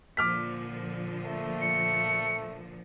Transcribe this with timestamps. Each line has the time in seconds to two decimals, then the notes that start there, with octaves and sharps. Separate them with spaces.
0.17 A#2 D3 F3 D6 F6 B6
1.25 A3
1.61 C#7